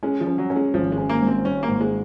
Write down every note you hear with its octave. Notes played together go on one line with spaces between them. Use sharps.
G#3 C#4
F3
C#4
F#3
C#4
G#3
G#1 F3
G#3
C#4
A#3
G#2
C4
G#2 C#4
A#3
G#2
G#3